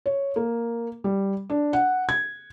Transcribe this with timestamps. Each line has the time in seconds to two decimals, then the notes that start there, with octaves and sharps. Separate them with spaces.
0.06 C#5
0.36 A#3
1.04 G3
1.50 D4
1.73 F#5
2.09 G#6